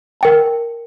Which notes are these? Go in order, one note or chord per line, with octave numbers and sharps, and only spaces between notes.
A#4 G5 A5